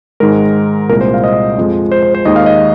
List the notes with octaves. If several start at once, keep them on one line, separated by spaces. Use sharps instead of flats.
G#2 D#3 G#3 A#4
C2 A#2 G#3 A#4
C5
F5
D#5
F2 F3 G#3
C5
C5
C5
D#2 D#3 G#3 D#5
F5
D#5